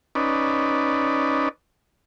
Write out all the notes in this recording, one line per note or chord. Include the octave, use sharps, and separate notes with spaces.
C#4 D#4 B4 D5